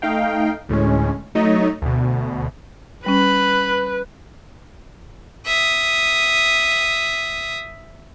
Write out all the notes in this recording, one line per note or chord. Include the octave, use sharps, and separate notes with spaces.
A3 D#4 F5 G5
D2 A2 G#3 C#4
F#3 A3 D#4 C#5 D#5
D2 B2
G3 C#4 B4 B5
E5 D#6